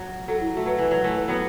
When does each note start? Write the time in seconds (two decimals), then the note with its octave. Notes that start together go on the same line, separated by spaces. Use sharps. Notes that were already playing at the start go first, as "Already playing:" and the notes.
Already playing: F#3
0.28 F#3 A4
0.41 E4
0.54 A3 F#4
0.66 F#3 B4
0.78 E3
0.91 F#3
1.04 E3 A3
1.28 F#3 B3